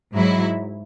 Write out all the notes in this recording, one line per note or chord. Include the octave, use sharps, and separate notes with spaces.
G#2 F#3 E4